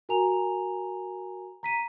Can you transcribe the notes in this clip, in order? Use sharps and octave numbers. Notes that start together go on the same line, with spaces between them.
F#4 A#4 G#5 A#5 F7
A#5 B6 D#7